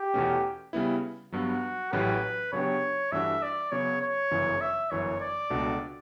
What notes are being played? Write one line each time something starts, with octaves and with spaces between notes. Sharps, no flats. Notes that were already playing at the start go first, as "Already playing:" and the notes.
Already playing: G4
E2 B2 A3 C#4
C#3 G3 B3 E4
G2 F#3 B3 F#4
A1 A2 F#3 C#4 G4 B4
C#3 F#3 B3 D4 G4 C#5
G2 E3 A3 D4 F#4 E5
D5
C#3 F#3 B3 C#5
C#5
G1 F#2 C#3 E3
E5
G1 F#2 E3 C#5
D5
C#2 B2 A3 D4 F#4